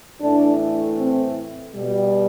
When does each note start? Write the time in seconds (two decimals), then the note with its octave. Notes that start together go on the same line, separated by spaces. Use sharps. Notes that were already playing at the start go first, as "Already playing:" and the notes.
0.21 A2 E3 A3 D4
0.98 C4
1.74 B2 G3